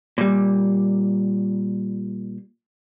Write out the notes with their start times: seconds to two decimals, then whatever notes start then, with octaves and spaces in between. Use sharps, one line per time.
0.18 A#2 G3